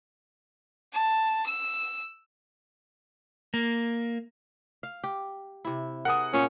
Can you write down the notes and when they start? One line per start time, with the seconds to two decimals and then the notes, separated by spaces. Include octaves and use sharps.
0.93 A5
1.47 E6
3.54 A#3
4.83 F5
5.03 G4
5.65 C3 E4
6.05 G#4 A#4 F#5 D#6
6.33 A#2 C#4